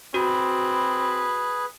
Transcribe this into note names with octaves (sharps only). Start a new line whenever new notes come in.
C4 F#4 G#4 B4 B5